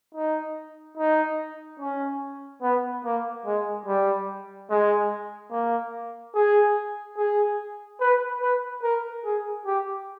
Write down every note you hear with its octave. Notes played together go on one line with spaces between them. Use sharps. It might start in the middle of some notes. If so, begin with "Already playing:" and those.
D#4
D#4
C#4
B3
A#3
G#3
G3
G#3
A#3
G#4
G#4
B4
B4
A#4
G#4
G4